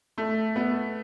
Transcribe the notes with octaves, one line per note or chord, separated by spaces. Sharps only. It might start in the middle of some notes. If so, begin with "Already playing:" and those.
A3
B3